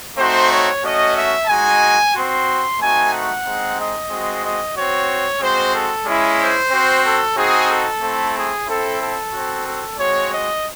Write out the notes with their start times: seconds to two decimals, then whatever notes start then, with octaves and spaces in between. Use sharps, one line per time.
0.17 A3 C4 D#4 F#4 C5
0.49 C#5
0.83 A3 C#4 F#4 D#5
1.15 E5
1.48 G#3 D#4 F#4 G#5
2.13 C4 F#4 C6
2.79 A3 C4 D#4 F#4 G#5
3.11 F#5
3.45 G#3 C4 D#4
3.77 D#5
4.09 G#3 C4 F#4
4.43 D#5
4.75 C4 F#4 C#5
5.40 G#3 C4 F#4 C5
5.73 A4
6.06 G#3 C#4 E4
6.39 C5
6.71 C4 F#4
7.05 A4
7.36 C4 D#4 F#4 G#4
7.69 A4
8.02 A3 C4 E4
8.35 G#4
8.67 C4 E4 A4
9.00 A4
9.32 C4 F#4
9.66 A4
9.98 G#3 C4 F#4 C#5
10.31 D#5